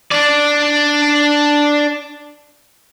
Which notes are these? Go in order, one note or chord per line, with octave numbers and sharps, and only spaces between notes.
D4 D5